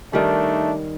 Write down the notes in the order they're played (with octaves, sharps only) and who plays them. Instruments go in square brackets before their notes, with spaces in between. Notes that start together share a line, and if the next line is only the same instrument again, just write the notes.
[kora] D#3 G3 [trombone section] A3 D4 D#4